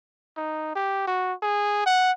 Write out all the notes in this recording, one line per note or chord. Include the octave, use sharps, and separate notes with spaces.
D#4
G4
F#4
G#4
F#5